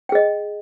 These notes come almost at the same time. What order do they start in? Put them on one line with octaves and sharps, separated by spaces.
G5 G#4 D#5